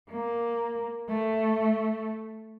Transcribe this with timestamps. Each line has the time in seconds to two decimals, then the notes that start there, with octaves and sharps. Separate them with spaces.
0.10 A#3
1.09 A3